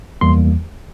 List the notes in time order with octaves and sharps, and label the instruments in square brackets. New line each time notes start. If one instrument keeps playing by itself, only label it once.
[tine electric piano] E2 E3 G3 A#3 C6